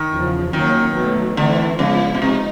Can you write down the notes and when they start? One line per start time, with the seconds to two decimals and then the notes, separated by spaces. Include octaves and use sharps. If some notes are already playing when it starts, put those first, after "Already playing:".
Already playing: D#3
0.12 E2 C#3 F3
0.53 D#3 F#3 A#3 C#4
0.95 B2 F#3 A3
1.37 D3 E3 A3 C4 E4
1.79 C#3 F3 G#3 B3 E4
2.15 B2
2.21 C3 D#4